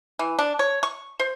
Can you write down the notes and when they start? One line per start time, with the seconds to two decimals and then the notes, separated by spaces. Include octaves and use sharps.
0.19 E3
0.39 D4
0.59 C#5
0.83 C#6
1.20 C5